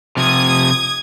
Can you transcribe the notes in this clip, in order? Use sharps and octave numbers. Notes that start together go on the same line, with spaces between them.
C3 F3 D#6 G#6